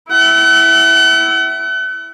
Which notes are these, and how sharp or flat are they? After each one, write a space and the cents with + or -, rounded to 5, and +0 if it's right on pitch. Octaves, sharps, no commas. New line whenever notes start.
E4 +0 F#5 +40